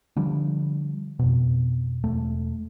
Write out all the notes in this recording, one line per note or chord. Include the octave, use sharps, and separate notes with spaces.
D3 F3 G3
F2 B2
E1 A3